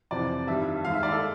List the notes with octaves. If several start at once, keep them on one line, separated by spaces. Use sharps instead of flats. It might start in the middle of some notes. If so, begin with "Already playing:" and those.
F2 C3 E3 D5
G2 D#3 G3 E5
D#2 D#3 G#3 F5
E5
D5
A4